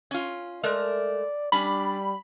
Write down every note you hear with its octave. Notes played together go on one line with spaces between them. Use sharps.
C#4 F4
G#3 A3 A#4 D5
G3 C#4 D4 B5